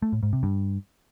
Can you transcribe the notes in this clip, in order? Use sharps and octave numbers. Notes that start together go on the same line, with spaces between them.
A3
A2
G#2
C3
G2